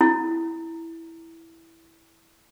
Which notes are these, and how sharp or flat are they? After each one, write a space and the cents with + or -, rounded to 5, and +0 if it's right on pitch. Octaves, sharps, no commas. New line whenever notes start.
E4 +0